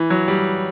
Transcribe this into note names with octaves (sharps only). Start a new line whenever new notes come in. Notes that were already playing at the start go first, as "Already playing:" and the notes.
Already playing: E3
F#3
G3